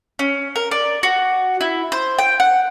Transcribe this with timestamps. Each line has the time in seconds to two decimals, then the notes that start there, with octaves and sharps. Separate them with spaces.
0.19 C#4
0.56 A#4
0.71 D5
1.03 F#4
1.61 E4
1.92 C5
2.19 G5
2.40 F#5